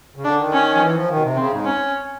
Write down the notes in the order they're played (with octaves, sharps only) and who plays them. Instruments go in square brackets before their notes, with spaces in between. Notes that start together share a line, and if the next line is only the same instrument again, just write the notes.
[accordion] C#3
[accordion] D3 [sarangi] D4
[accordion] D#3
[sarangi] C#4
[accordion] F3
E3
F3
D#3
B2
C3
[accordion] C#3 [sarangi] C4
[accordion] G#2
[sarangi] C#4